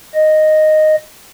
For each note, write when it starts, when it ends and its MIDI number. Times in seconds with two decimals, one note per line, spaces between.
0.15 0.96 75